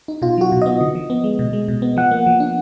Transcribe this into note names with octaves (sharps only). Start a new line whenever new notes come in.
D#4
B2 F4
F#3 F#4
B2
B3 D#5
D3
F3
B3
G#3
B2
G#3
B2
B3
F3 F#5
A#3
F3
D4